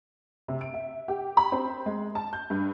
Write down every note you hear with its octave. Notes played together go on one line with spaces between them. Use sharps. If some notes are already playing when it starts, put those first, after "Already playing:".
C3
D7
E5
G4
B5
C4
G#3
A5
G6
G2